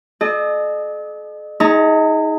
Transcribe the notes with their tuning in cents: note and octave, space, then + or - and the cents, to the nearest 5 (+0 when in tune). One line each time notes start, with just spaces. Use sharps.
A4 -45 D#5 -40
D#4 +25 G#4 +0 A#5 -40